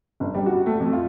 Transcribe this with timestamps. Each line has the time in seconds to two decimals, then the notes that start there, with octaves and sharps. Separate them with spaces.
0.20 G1
0.34 G3
0.46 F#4
0.66 A3
0.80 F2
0.93 F4